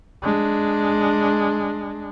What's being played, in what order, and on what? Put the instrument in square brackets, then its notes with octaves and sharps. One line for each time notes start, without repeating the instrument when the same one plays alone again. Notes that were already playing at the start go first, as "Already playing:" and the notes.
[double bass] G#3 D4